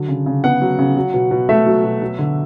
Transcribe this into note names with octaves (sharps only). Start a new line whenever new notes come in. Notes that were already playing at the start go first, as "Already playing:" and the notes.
Already playing: D3 F#3
C#3
C#3
B3 F#5
F#3
C#3
F#3
B2
B2
A3 E5
F#3
B2
F#3
D3